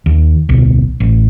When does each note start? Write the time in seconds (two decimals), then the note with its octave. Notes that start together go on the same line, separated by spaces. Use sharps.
0.06 D#2
0.49 D1 B1
1.00 A1